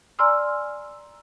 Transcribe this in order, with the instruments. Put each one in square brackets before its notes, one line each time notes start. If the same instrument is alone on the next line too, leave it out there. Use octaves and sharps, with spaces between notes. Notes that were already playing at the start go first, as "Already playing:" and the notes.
[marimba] D5 G#5 A#5 C6 E6 F6